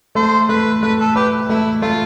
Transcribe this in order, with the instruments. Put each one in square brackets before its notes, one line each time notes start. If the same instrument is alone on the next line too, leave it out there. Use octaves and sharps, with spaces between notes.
[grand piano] A3 [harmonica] C5
[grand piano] A3 [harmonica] B4
[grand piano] A3 [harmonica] B4
[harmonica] A4
[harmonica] G4 [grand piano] B4
[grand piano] A3 [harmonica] E4
[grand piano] A3 [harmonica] F4